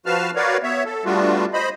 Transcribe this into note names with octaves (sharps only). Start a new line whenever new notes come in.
F3 F#4 B4 F5 A5 F6
F#4 A#4 B4 C#5 D5 F5
B3 C#5 E5
A4
G3 A3 B3 D4 F4 F#4
C5 D#5 B5